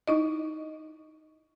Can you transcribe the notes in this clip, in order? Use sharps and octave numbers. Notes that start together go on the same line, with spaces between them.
D#4 E4 D#5